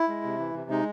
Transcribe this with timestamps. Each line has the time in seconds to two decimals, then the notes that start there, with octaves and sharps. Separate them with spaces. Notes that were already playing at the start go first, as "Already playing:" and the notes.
Already playing: E4
0.08 G#3
0.24 C3
0.40 E3
0.54 C3
0.70 G#3 D#4